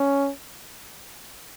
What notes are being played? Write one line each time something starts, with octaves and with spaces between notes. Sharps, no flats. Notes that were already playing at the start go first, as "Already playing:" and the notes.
Already playing: C#4